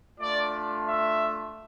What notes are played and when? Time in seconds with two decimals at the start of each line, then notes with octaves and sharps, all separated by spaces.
0.19 A3 D4 F4 D5
0.85 E5